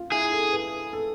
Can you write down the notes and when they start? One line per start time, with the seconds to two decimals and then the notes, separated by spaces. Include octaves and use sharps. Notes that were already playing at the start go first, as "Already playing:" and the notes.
Already playing: F4
0.12 E4 G#4
0.32 A4
0.52 B4
0.93 A4